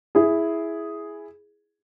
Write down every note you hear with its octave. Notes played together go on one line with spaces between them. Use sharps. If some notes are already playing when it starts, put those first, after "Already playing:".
E4 G#4